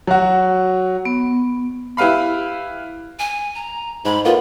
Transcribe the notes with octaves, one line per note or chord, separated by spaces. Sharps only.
F#3 F#4
B3
E4 G4 B4 F5 B5
G#5
A#5
G#2 B5
A2 A#3 B3 F4